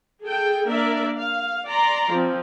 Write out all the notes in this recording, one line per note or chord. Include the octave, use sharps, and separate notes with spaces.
G#4 A4 G5
A#3 D4 A#4 D5 E5
F5
D5 A#5 C6
F3 C4